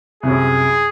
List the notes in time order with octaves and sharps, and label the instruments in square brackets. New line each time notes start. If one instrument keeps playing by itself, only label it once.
[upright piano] C2 F#2 [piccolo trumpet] G#4